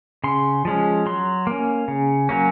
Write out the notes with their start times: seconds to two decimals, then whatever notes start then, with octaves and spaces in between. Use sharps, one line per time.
0.24 C#3 C6
0.65 F3 G#3 C#4
1.06 F#3 C6
1.47 A#3 C#4
1.88 C#3
2.29 F#3 A#3 C#4